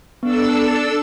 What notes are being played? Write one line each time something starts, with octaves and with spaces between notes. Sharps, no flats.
B3 D4 A4 E6